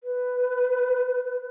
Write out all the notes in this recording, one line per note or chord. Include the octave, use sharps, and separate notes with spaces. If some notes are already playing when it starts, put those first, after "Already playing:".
B4